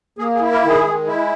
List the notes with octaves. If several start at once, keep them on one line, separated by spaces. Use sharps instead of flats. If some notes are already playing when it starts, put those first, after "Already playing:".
A#3 G#4
G#4
E4
A#4
D#3 G#4
G#3
E4